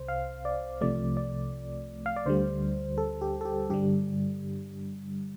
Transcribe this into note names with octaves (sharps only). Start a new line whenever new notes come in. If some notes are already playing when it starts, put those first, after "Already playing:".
Already playing: C2 C3 C5
F5
D5
C2 C3 F3 A3 D5
D5
F5
D5
D2 D3 G3 C5
A4
G4
A4
G4
G2 D3 G3 G4